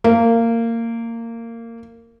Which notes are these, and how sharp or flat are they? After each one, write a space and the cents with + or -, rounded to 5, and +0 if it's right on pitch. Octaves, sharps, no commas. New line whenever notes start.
A#3 -20